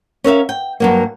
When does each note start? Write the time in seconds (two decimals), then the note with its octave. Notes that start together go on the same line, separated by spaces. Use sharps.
0.24 C#4 A#4 E5 F5
0.49 G5
0.80 G2 F#3 A#3